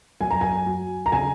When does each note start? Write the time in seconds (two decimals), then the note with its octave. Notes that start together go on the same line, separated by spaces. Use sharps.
0.21 F#2 G#5
0.31 A#5
0.41 G#5
0.66 F#3
1.06 A#5
1.12 C#3 G#5